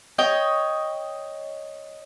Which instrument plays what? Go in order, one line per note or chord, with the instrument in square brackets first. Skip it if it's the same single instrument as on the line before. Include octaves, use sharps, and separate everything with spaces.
[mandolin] C#5 D#5 G5